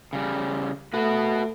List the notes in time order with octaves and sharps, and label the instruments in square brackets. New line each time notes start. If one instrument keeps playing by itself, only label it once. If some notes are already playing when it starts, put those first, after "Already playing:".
[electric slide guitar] C#3 G3
[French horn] A3 [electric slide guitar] F#4 B4